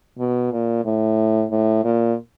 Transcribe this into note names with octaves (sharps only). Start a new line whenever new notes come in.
B2
A#2
A2
A2
A#2